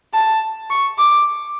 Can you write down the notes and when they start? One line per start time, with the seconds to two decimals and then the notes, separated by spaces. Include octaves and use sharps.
0.14 A5
0.70 C#6
0.98 D6